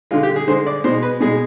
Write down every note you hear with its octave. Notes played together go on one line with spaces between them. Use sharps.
D3 G#3 F4
G4
G#4
D3 G#3 C5
D5
B2 G#3 C5
B4
B2 G#3 G#4